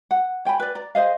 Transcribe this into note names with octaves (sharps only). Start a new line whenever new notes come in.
F#5
C#5 G5 G#5 B5
B4 D5
D5 A#5
G#4 C5 D#5 F5